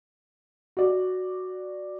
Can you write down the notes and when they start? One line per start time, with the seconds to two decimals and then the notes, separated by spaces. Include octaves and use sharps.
0.77 F#4 D5